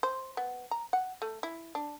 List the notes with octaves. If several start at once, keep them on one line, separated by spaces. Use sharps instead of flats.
C5
B3
A#5
F#5
A3
E4
D4